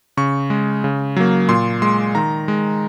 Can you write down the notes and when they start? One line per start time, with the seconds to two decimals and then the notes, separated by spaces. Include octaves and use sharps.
0.17 C#3 C#6
0.50 G#3
0.84 C#3
1.16 F#3 A#3
1.49 A#2 C6
1.82 G#3 C6
2.15 D#3 A#5
2.48 G#3